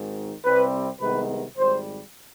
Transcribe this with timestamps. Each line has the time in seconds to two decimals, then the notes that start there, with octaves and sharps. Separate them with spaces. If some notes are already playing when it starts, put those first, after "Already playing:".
Already playing: G#1 G#2 D#3
0.44 C2 C3 G3 C4 B4
0.99 C2 C3 D#3 G#3 B3 B4
1.56 G#1 G#2 G3 C5